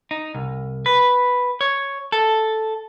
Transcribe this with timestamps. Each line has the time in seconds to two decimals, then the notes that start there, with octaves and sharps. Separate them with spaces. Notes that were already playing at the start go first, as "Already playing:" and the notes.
0.11 D#4
0.35 C2
0.86 B4
1.61 C#5
2.12 A4